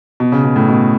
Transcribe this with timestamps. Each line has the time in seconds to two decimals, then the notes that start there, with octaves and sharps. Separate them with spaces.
0.20 B2
0.32 C#3
0.44 B2
0.56 A2
0.69 B2